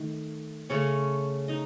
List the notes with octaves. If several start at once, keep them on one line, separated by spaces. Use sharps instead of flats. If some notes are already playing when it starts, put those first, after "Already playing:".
Already playing: D#3 A3
C#3 A3 C#4 C#5
D#4 D#5